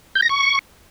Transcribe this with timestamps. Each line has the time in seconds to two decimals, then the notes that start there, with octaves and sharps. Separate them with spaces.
0.15 G6
0.22 A#6
0.29 C#6